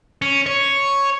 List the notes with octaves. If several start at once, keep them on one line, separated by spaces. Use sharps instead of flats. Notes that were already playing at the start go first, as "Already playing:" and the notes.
C#4
C#5